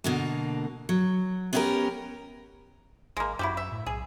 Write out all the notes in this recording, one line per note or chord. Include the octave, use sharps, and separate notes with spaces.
B2 D3 A#3
F#3
B3 C#4 E4 F4 G4 A#4
G#1 G#3 A#3
F#2 E4 F#4 G4
E5
A2
B1 G#4